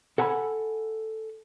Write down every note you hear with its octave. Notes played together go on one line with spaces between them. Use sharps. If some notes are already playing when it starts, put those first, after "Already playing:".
A4 F#5 G#5 A#5 B5